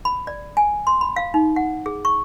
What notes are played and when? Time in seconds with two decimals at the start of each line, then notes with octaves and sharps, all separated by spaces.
0.05 B5
0.27 D5
0.57 G#5
0.87 C6
1.01 B5
1.16 F5
1.34 D#4
1.56 F#5
1.86 G#4
2.05 C#6